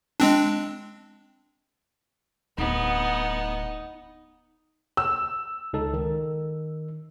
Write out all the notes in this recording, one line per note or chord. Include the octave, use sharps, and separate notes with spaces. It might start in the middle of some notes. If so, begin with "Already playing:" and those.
G#3 C4 D4
D1 B3 C4 D#4
E6
C#2 D#4 A4
D#3